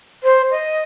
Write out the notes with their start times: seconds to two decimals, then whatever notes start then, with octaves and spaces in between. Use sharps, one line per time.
0.24 C5
0.51 D#5